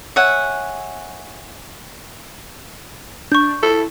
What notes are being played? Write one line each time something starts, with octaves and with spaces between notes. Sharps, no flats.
C#5 E5 F#5 G#5
D4 C#6 G6
E4 A4